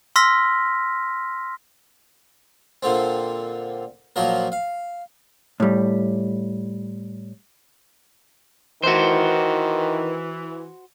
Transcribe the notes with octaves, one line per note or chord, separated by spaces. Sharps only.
C6 E6 F6 A#6 B6
A#2 D3 C4
A#2 F3 F#3 A#4
F5
A2 G3
D#3 E3 F#4 C5